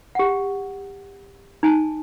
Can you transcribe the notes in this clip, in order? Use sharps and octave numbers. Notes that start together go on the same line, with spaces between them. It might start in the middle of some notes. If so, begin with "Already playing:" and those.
G4 F#5
D#4 G#5 A5